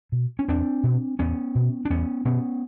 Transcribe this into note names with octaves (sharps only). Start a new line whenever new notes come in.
B2
C#4
E2 C4 D4
B2
E2 B3 C#4
B2
D4
E2 B3 C#4
B2 B3 C#4